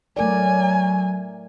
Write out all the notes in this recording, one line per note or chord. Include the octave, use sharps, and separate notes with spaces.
F#3 A3 A#4 D5 G#5